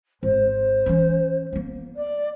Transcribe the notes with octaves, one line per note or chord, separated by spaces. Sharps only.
G#1 C5
E3 C#4
A#3 B3
D5